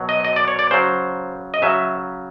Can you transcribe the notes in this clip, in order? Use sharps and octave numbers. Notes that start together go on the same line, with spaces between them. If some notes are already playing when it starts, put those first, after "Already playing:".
Already playing: B2 F#3
D#5
D#5
D5
C#5
D5
C#3 F#3 C5
D#5
C#3 F#3 E5